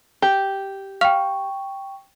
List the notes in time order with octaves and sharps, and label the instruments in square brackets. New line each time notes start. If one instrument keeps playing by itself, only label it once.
[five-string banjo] G4
[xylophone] F5 F6 F7 [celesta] G5 C#6